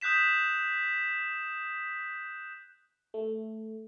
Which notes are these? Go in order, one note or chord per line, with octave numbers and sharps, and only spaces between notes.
D#6 F#6 G6 B6 E7
A3